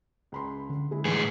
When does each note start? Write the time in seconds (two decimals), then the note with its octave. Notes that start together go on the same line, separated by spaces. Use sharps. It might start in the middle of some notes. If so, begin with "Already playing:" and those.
0.32 C#2 B5 C6
0.70 D3
0.91 G#3 E4
1.05 A2 E3 G#4